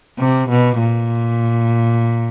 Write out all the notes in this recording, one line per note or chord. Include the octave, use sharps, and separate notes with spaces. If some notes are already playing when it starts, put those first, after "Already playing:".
C3
B2
A#2